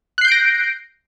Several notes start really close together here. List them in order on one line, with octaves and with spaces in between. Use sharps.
F#6 C7 G6 D7 A#6